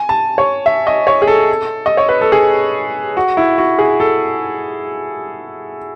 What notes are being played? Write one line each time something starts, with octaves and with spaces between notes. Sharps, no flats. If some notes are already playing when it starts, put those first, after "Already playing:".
Already playing: G#5
A5
C#5
E5
D#5
C#5
G#4
A4
D#5
C#5
B4
A4
G#4
F#4
E4
F#4
G#4
A4